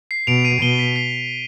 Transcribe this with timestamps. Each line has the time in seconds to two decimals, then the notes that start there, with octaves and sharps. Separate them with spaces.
0.11 C7
0.27 B2 D7 F7
0.45 C7 D#7
0.62 B2 D#7 G7
0.79 B6
0.96 C7